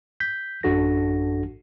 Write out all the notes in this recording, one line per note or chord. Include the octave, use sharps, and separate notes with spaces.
G6 B6
A1 F#2 D4 F#4 A4 A#6